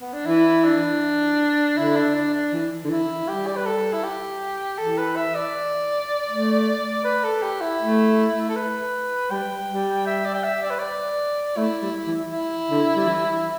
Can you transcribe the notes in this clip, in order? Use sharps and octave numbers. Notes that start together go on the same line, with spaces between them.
B3
D4
E3 E4
D4
D3 E4
D4
D4
D4
E3
D3
E3 E4
G3 G4
D5
B4
A4
E4
G4
E3 A4
B4
E5
D5
A3
B4
A4
G4
E4
A3
A4
B4
G3 G5
G3
E5
D5
G5
E5
D5
B4
D5
A3 E4
G3
E3
E4
D3
G3
E3